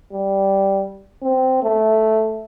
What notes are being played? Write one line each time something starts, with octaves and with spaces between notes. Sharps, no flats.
G3
C4
A3